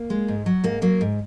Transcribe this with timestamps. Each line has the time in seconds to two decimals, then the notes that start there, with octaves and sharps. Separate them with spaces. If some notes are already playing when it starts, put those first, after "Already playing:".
Already playing: A#3
0.10 G#3
0.28 G#2
0.46 F#3
0.64 G#2 A#3
0.82 F#3 A#3
1.01 G#2